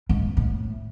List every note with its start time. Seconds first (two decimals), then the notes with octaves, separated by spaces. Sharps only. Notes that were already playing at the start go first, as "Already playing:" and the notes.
0.09 G#2
0.37 A2